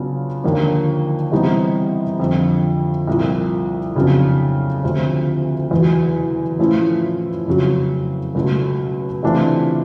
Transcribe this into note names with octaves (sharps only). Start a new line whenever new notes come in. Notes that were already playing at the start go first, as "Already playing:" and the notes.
Already playing: C#3 F#3 B3 D4 F4
D#2 D3 F3 A#3 D4
C3 E3 G3 B3 D#4
F2 D3 F3
C2 A#2 F3
F2 C#3 F#3 B3 D4
D2 C3 F3
E2 B2 F#3
A2 F3 A3 C#4 E4
F2 C#3 F#3
C#2 B2 F#3 A3
C3 E3 A3 D4 F4